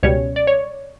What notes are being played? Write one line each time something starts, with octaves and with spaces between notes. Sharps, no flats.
C#2 B2 G3 C#4 C#5
D5
C#5